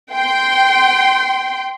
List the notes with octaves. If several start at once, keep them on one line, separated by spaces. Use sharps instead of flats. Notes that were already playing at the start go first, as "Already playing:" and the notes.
G5 C6